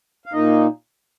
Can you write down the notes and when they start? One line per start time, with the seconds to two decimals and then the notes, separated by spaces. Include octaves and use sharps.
0.26 F5
0.32 A#2 A#3 D#4 D#5